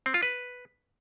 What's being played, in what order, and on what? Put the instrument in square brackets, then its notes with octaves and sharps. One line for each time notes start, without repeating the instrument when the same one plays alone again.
[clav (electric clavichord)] C4
F4
B4